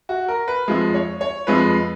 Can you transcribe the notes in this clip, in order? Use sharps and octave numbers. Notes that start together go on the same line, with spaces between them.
F#4
A#4
B4
F2 F3 G#3
C#5
C#5
F2 F3 G#3 B4